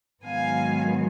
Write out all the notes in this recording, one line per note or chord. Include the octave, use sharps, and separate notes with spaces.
G#2 D#3 F#3 B3 F5 G#5